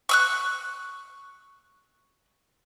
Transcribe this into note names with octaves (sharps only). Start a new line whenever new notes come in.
C#6 E6 F#6